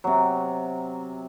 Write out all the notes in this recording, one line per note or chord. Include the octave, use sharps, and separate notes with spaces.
C3 F#3